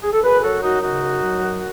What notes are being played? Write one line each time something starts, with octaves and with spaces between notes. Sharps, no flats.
G#4
A4
F#2 G#4 B4
F#3 F#4 A4
F#2 D#4 F#4
C#3 D#4 F#4
F#2
F#3
F#2